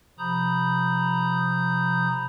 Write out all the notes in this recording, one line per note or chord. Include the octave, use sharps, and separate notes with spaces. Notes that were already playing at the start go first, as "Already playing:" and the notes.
C3 F3 A#5 B5 D#6 G6